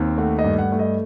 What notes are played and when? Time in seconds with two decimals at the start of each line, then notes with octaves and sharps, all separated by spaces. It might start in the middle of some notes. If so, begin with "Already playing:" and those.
Already playing: D#2 C4
0.18 A3 F#5
0.39 D#5
0.44 G2
0.58 F#5
0.72 A3
0.79 D#5